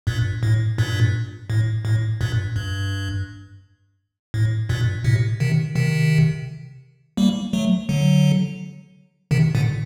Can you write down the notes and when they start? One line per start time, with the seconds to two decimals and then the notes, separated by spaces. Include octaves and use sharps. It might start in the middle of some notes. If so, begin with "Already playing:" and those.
0.07 G2 A#2
0.43 A2
0.78 G2 A#2
1.50 A2
1.85 A2
2.21 G2 A#2
2.56 G2
4.34 A2
4.69 G2 A#2
5.04 A2 C3
5.40 C3 D#3
5.75 C3 D#3
7.17 G3 A#3
7.53 F#3 A3
7.89 D3 F#3
9.31 C3 D#3
9.55 A#2 D3